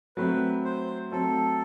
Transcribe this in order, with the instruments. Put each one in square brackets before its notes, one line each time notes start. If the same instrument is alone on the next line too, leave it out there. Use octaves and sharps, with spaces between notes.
[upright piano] F#3 A3 C4 [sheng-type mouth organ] B4
[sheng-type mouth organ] C5
[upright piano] F#3 A3 C4 [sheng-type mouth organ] A4